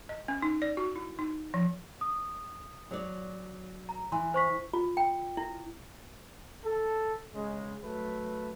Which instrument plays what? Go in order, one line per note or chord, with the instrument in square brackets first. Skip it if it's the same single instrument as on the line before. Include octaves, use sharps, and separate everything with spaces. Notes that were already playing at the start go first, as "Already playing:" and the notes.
[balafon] D#5
C#4
D#4
D5
F#4
E4
D#4
F3
[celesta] D#6
[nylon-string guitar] F#3 C#5 D5
[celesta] A#5
[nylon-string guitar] E3 [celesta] C6
[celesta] C5 C#6 B6
[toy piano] F4
G5
E4
[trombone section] A4
C#3 G#3
F#3 A3 B4